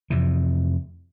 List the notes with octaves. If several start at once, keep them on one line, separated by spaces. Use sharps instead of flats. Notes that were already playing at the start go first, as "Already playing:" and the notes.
F2 C3 E3